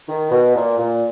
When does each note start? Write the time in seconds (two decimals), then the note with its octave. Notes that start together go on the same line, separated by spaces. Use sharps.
0.09 D#3
0.31 B2
0.56 A#2
0.79 A#2